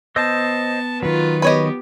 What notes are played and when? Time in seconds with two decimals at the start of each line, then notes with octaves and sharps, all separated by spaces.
0.16 B3 C5 D#5 A5 E6
1.03 D#3 F#3 F4 B4
1.42 B3 G4 B4 C#5 D#5